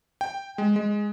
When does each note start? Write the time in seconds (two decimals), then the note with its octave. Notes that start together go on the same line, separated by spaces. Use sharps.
0.21 G5
0.58 G#3
0.76 G#3